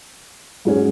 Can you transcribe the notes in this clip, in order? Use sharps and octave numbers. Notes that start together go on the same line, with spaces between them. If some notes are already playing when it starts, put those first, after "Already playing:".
G#2 F#3 C#4 G#4